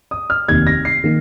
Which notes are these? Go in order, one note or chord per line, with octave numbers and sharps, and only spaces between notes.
D#6
F6
F1 D#2 D#3 G#6
A#6
C7
D#3 A#3